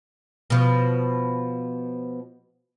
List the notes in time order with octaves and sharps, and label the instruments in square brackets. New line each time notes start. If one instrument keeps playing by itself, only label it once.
[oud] B2 F3